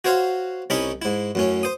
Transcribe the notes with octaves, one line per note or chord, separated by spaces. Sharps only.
F#4 C5 C#5 F5 C6
C2 C#4 D#4 E4 B5 C#6
G#2 E4
F#2 A2 C#4
C5 D#6